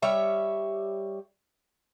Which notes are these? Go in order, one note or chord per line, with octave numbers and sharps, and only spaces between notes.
G3 C#5 E5